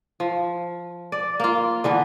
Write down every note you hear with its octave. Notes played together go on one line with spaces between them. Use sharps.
F3
D5
A#3 F4
D3 E3 B3